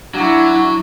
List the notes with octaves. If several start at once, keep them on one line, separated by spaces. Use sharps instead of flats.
F#3 D4 E4 F#4